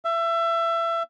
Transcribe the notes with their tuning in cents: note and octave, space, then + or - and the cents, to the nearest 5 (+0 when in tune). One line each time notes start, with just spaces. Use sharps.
E5 +25